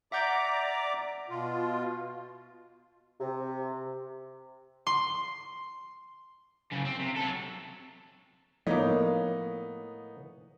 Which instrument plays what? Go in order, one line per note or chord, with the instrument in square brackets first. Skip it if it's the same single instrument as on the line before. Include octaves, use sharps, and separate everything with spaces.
[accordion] D5 A#5 D6 [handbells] E5 F#5 G6
[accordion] B2 F4
[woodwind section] C3
[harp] C6
[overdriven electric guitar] F#2 C#3
C4
C3
F#3 A4
[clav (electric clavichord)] A2 A#3 [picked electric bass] F3 [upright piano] B3 D#4 C#5